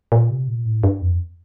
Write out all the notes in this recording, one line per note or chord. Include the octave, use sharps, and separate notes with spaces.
A#2
C3
A#2
A2
G2
F2